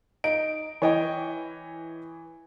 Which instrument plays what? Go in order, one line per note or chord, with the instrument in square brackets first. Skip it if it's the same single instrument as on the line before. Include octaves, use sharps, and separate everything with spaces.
[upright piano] D#4 [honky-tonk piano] D7
[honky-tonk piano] E3 [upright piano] C#5 D#5 G5